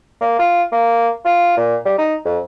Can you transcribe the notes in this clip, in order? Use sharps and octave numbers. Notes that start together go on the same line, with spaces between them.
A#3
F4
A#3
F4
A#2
G3
D#4
F2